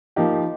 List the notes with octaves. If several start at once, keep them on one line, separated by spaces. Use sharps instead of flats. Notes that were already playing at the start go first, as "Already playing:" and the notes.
F3 A#3 D#4 G4